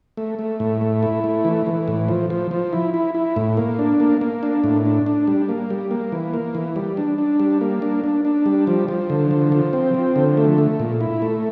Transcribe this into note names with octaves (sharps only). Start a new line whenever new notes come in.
A3
A3
A2
A3
E4
A3
E3
E3
A2
F3
F3
F3
E4
E4
E4
A2
A#3
D4
A#3
A#3
D4
A2
D4
D4
G3
A#3
G3
A#3
E3
A#3
E3
G3
D4
D4
G3
A#3
D4
D4
D4
G3
F3
F3
D3
F3
F3
C4
F3
D3
A3
A3
A#2
E4
A3